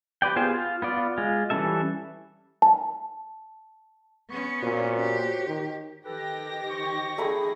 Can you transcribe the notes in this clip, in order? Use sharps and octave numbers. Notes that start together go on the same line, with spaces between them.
G4 B4 D5 G5
B3 F4 G4 G#4 C5
F4
B3 F4 D5
G#3 F4
E3 G3 C#4 A4 E5
A5
B3 C#4 C#6
A#2 F#4 C5 C#5
G4
D#3
D#3 G4 A4 B4 A#6
C5 C6 C#6
A3 G#4 B5